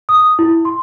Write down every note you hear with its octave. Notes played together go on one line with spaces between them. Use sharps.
D#6
E4
C6